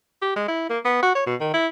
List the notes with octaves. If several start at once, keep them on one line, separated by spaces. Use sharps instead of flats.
G4
G#3
E4
A#3
B3
F#4
C#5
B2
D#3
E4